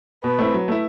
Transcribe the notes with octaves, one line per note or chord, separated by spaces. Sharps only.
B2 B4
A3 C4 E4
F#3
A3 E4